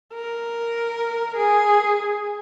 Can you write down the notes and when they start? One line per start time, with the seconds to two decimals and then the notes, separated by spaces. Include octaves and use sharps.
0.14 A#4
1.37 G#4